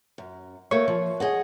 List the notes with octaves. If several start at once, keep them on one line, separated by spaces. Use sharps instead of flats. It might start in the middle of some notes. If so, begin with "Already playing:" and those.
F#2
A3 A#3 C#5
F3
G#4 D#5 F#5